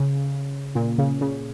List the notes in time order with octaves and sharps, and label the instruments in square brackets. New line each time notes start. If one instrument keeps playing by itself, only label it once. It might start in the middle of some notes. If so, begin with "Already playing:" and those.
Already playing: [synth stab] C#3
A#2
C#3
C#3